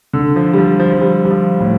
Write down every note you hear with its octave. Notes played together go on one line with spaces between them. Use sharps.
D3
F3
G3
F3
F3
F3
G3
G3
F3
A2